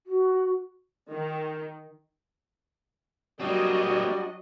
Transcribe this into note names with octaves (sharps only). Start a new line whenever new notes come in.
F#4
D#3
F#3 G3 A#3 C4 D4 F#4 D#5